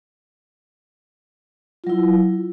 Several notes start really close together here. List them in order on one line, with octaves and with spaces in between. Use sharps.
F4 F#3 E4